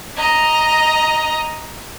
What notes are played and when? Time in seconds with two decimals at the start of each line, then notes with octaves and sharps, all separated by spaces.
0.17 D#5 A#5